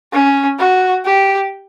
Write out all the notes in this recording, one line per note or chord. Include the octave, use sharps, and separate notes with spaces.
C#4
F#4
G4